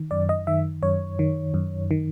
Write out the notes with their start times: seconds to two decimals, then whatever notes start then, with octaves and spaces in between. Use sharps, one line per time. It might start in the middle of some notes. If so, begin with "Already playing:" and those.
Already playing: D#3
0.11 F#2 D5
0.29 D#5
0.47 D#3 E5
0.83 F#2 C#5
1.19 D#3
1.54 F#2
1.91 D#3